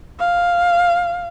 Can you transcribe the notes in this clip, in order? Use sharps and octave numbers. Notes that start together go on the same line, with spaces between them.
F5